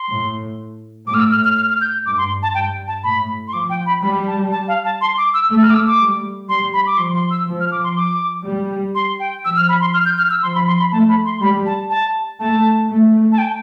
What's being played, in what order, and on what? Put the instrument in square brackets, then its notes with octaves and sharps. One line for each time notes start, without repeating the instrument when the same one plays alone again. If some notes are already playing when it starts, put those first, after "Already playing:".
Already playing: [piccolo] C6
[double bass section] A2
[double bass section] A2 [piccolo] D6
[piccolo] F6
E6
F6
F6
F6
F6
G6
[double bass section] G2 [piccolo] D6
[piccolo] C6
A5
[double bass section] G2 [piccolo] G5
[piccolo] A5
[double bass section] A2 [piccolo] B5
[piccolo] C6
[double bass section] F3 [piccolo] D6
[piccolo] G5
B5
[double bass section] G3 [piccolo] B5
[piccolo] A5
A5
F5
A5
C6
D6
E6
[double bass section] A3 [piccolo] E6
[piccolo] F6
D6
E6
D6
[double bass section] G3
[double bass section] G3 [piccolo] C6
[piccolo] B5
D6
[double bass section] F3 [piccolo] C6
[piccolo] C6
E6
[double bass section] F3
[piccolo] F6
D6
C6
D6
[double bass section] G3
[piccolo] C6
G5
[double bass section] F3 [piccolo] E6
[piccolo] F6
B5
C6
F6
G6
F6
E6
[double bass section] F3 [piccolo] C6
[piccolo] B5
C6
B5
[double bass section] A3 [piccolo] A5
[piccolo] B5
C6
[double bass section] G3 [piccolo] B5
[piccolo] A5
A5
[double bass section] A3 [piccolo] A5
[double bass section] A3
[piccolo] A5
G5